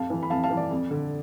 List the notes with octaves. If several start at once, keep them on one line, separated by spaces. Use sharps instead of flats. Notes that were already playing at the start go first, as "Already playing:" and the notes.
Already playing: F2 F5 A5
E3
B5
F2 F5 A5
F5 A5
E3
D5
F2
D3